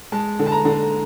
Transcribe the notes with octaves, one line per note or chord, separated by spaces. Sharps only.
G#3 A5
D3
A5
A#5
D3